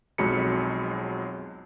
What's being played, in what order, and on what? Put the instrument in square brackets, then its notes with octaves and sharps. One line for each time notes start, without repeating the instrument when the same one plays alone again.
[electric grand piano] B1 F2 F#3 G#3 B5 C#7